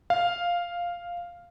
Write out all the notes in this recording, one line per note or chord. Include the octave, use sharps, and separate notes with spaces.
F5